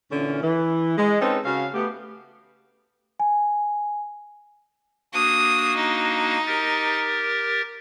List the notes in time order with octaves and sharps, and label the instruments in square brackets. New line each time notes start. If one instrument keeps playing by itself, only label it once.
[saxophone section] A#2 D3 E3 C#4
E3
G#3
C4 C#4 D#4 A4 B4 C5
C#3 F#4 C#5 F5
A3 B3 G4
[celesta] G#5
[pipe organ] A#3 D4 F#4 [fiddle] D#6
[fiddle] D#4
[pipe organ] G4 A#4 A6